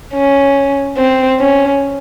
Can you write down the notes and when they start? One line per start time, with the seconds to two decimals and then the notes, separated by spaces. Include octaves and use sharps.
0.14 C#4
0.98 C4
1.39 C#4